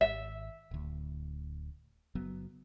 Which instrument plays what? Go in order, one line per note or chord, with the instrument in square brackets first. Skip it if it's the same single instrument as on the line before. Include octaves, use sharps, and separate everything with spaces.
[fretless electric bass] G#1 [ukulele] E5
[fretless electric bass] D1 D2
F#1 F#3 B3